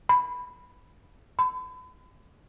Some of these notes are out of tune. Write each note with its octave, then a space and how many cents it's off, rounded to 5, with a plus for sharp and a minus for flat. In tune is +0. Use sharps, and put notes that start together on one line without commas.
B5 +0
B5 +40